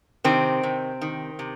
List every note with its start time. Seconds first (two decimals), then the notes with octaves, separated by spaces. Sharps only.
0.24 C3 D#3 C4
0.63 C3
1.02 D#3
1.39 C3